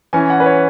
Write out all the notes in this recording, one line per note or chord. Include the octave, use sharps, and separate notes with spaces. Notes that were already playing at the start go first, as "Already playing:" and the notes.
E3 C#4 G#5
F#5
B4
C#5